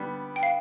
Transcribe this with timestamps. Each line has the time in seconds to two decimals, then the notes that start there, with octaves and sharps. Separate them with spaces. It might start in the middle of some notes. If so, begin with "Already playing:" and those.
Already playing: D3 G3 B3
0.36 G5
0.43 F5